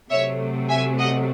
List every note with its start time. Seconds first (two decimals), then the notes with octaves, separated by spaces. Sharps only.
0.10 C3 F#3 A3 C#5 E5
0.69 E5 G#5
0.99 D#5 F#5